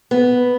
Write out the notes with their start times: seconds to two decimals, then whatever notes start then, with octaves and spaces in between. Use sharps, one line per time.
0.11 B3